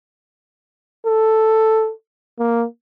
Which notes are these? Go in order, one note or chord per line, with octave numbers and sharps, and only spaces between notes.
A4
A#3